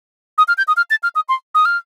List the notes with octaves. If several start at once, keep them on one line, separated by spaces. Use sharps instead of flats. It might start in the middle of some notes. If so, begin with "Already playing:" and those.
D#6
F6
G6
D#6
F6
A6
F6
D#6
C6
D#6
F6